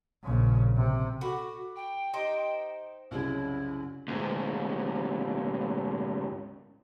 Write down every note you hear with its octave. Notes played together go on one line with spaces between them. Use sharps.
A#1 C#3
C3
F#4 A4 F#5 B5 D6
G5
D#4 G4 C5 D#5
C2 F#2 C#3 E4
D2 G#2